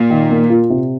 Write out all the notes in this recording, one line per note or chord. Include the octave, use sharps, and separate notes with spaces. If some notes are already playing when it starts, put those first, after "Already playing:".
Already playing: A#2
D#3
A#3
F4
C3